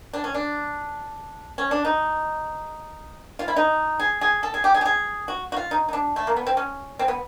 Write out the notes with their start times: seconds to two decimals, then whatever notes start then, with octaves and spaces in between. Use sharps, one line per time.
0.13 D4
0.24 C#4
0.34 D4
1.58 C#4
1.71 D4
1.85 D#4
3.39 F4
3.48 E4
3.56 D#4
4.00 G#4
4.21 G#4
4.43 A4
4.54 G#4
4.64 G4
4.74 G#4
4.81 G4
4.86 G#4
5.28 F#4
5.52 F#4
5.56 F4
5.71 D#4
5.88 D#4
5.93 D4
6.16 A3
6.27 A#3
6.36 B3
6.47 C4
6.57 C#4
6.99 C4
7.08 B3